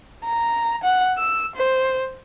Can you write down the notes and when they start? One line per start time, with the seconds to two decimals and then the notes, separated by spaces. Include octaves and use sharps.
0.25 A#5
0.84 F#5
1.18 E6
1.56 C5